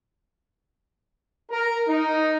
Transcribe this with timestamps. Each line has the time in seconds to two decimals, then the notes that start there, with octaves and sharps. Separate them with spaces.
1.51 A#4
1.89 D#4